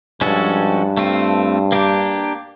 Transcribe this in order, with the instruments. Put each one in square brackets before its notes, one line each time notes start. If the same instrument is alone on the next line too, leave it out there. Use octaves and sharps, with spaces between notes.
[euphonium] G2 [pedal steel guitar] F3 G#3 C#4 F#4 A4
[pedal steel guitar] A3 C4 F4
A#3 D4 G4